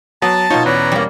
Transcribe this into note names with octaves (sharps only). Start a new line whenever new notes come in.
F#3 B3 A5
B2 D#4 F4 C#5
E2 C#4 B4 D5 A#5
G3 A#3